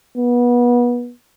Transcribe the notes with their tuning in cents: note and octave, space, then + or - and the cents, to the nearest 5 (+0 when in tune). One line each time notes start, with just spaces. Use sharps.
B3 -25